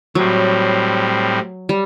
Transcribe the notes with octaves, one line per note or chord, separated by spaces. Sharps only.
A2 F#3 G3 C4
G3